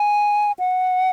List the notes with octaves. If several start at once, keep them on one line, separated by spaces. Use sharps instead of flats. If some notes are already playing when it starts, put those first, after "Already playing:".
Already playing: G#5
F#5